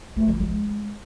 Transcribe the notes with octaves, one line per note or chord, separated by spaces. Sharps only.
A3
F3
G#3